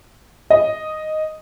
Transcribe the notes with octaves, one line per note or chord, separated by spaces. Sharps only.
D#5